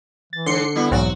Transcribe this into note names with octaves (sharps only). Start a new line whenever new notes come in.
E3 A6
G#2 D3 C6 C7 C#7
G3 B3 E4
B1 E2 G#2 F#3 C4 F#4